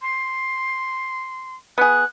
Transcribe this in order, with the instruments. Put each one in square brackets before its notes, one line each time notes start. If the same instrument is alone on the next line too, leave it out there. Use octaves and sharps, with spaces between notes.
[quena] C6
[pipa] B3 G#4 [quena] F#6